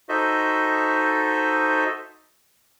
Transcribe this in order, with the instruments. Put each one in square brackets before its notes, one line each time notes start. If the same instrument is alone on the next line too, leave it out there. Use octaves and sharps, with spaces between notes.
[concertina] D#4 F#4 A4 C5 D#5 E5